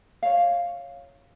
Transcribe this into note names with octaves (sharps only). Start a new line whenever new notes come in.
C#5 F5